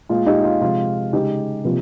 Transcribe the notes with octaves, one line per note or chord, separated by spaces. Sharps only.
A#2 G#3 F4
D#4 G4
F4
C3 F3 G#3 F4
C#3 G#3 D#4 G4
C3 F3 A#3